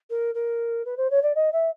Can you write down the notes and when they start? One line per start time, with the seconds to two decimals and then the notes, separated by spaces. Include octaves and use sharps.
0.10 A#4
0.34 A#4
0.85 B4
0.97 C5
1.10 C#5
1.22 D5
1.35 D#5
1.52 E5